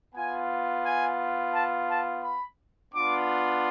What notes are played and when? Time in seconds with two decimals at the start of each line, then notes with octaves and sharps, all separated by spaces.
0.14 B3 F4 G#5
0.84 G#5
1.53 A5
1.88 A5
2.22 B5
2.92 B3 D4 F4 D6